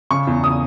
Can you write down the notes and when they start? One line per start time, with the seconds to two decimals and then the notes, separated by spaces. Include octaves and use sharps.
0.11 C#3 C#6
0.27 E2
0.44 C#3 D#6